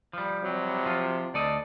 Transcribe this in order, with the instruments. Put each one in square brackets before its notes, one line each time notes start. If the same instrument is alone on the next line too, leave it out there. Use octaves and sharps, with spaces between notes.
[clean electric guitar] F3 G3
[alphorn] C3 [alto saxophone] F#3
[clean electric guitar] F3 F4
[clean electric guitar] D2 A4 D#5 [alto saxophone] D5